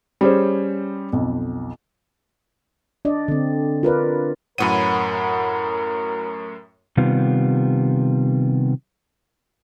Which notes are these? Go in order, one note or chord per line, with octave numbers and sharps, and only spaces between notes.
G3 C#4 G#4 C5
B1 F2
D4 D5 D#5
D3 C4
F4 A#4 B4 D5
F#2 A2 F#3 B3 A#4 D#7
C3 D#3 G3 B3 F4